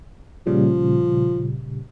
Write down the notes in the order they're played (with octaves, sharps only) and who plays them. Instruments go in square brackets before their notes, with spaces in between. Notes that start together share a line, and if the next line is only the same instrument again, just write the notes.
[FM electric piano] A#2 C#3 G3 [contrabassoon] F3